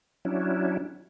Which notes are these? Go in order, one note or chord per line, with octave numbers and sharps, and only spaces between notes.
F#3 C#4 D4 E4